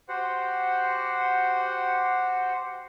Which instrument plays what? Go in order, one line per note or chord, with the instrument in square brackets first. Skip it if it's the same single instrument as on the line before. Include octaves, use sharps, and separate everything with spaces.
[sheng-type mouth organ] F#4 G4 C5 F#5